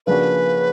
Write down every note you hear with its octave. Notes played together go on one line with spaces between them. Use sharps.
C#3 F3 A#3 D4 F#4 B4